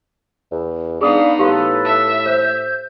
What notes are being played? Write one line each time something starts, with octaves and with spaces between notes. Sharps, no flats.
E2
B3 D4 D#4 G#4 F5 D#6
A2 G4 A4 B4 F5 C6
E5
C5 G6